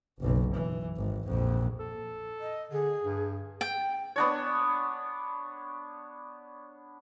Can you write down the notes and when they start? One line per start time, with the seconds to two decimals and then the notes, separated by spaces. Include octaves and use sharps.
0.19 F#1 B1
0.54 E3
0.96 G#1
1.25 A#1 F2
1.79 A4
2.40 D#5
2.72 D3 G#4
3.03 G2
3.61 G5
4.16 B3 D4 C#5